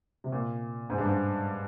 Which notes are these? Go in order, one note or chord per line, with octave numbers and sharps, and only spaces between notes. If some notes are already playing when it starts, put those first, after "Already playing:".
C3
A#2
G#2
G2
G#2